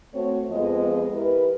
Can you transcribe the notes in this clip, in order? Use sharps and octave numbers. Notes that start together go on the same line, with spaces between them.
A3 C4 F#4 C#5
F2 F3 G#3 B3 D#5
E4 G4 A#4 B4